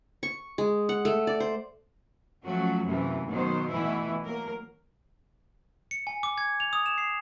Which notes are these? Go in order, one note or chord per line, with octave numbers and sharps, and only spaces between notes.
C#6
G#3
F#5
A3
D5
C5
F3 F#3 A3 C#4 F#4
F#2 C3 E3 A3 A#3
D#2 B2 D#3 F#3 C5
B2 E3 A3 E4
F#3 A#3 A#4
C#7
G#5
D6
G#6
F7
D#6
E7
C7